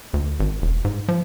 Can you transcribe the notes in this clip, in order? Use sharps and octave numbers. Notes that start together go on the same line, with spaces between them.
D2
G#1
E1
G#2
F3